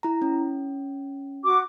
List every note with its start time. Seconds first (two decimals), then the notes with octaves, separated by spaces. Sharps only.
0.03 E4 A#5
0.22 C#4
1.44 F#4 D6